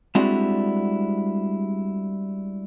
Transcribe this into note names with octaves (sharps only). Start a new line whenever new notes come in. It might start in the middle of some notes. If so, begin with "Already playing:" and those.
G3 G#3 C4 D4 E4 F#4